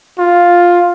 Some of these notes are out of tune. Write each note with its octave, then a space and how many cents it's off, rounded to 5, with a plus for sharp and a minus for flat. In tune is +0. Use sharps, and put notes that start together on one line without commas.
F4 +5